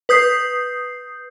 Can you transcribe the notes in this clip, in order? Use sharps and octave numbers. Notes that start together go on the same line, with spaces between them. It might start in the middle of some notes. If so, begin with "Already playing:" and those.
B4 D#6 G6 C7